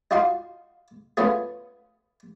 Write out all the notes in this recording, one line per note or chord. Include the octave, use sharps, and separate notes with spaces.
D#4 F4 F#4 F5 C6
A3 B3 C#4 F4 G#4